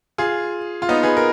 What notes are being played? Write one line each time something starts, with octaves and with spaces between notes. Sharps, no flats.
F4 G#4
F4
B3 D#4
G#4 B4
A#4